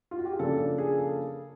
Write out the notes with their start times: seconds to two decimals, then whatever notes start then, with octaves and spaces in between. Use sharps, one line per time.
0.11 F4
0.19 F#4
0.25 G4
0.33 G#4
0.39 C#3 F3 A#3 D4 A4
0.58 A4
0.78 G#4
0.97 A4